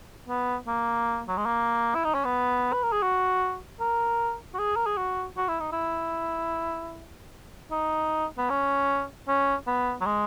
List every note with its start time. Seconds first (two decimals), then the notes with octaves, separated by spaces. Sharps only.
0.29 B3
0.67 A#3
1.28 F#3
1.37 G#3
1.46 A#3
1.95 E4
2.05 D#4
2.14 C#4
2.25 B3
2.73 B4
2.83 A#4
2.93 G#4
3.03 F#4
3.80 A#4
4.54 F#4
4.59 G#4
4.76 A#4
4.86 G#4
4.98 F#4
5.37 F#4
5.48 E4
5.60 D#4
5.72 E4
7.72 D#4
8.38 B3
8.50 C#4
9.28 C#4
9.67 B3
10.01 F#3
10.06 G#3